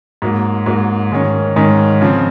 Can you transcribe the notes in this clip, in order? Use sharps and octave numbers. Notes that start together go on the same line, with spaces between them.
G#2 F#3 A#3
G#2 F#3 A#3
G#2 D#3 G#3 C#4
G#2 D#3 G#3 C#4
C#3 F3 C4